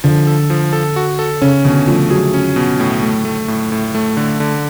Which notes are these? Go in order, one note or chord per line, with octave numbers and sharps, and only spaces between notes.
D3 F3
A4
F3
A4
F#4
A4
C#3 C#4
B2 D3
F3 A3
F#3 G#4
C#4
B2
A2
A3
A3
A2
A2
A3
D3
D3